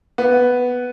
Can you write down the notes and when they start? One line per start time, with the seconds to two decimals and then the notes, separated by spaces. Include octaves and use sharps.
0.18 B3